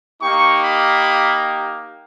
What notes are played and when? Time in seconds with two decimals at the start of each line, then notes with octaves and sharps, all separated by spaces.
0.21 A#3 D#4 G4 C#6
0.63 B5